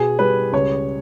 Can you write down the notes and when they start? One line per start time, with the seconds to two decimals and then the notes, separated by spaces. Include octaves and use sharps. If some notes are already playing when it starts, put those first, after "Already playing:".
Already playing: B2 G#4
0.19 G3 B4
0.53 C#2 C#5